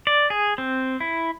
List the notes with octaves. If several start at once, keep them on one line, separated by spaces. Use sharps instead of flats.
D5
G#4
C4
E4